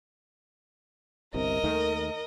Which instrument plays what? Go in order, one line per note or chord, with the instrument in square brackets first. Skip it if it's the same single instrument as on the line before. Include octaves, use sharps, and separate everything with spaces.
[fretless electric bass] G1 C2 C3 [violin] A#4 D#5
[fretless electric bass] D#2 D#3 A3